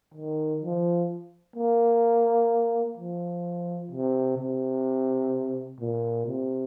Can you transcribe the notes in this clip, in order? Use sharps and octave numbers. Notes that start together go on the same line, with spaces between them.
D#3
F3
A#3
F3
C3
C3
A#2
C3